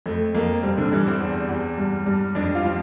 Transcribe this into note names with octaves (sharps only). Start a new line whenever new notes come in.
F2 A3
F2 A#3
G2 C3 C4
D3 D4
G2 E3 E4
C4 C5
E2
E2
G2
G2
F2 D4 D5
F4 F5
F3